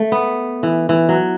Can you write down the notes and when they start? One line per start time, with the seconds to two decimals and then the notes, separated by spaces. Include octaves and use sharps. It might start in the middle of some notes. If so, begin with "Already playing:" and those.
Already playing: A3
0.12 B3
0.63 E3
0.89 E3
1.09 F#3